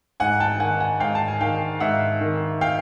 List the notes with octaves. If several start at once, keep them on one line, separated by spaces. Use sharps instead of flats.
G#2 F#5 G#5
G5 A5
D#3 F#5 G#5
F#5 G#5
G#2 F5 G5
A5
G#5
D#3 F5 G5
G#2 E5 F#5
D#3
F5 G5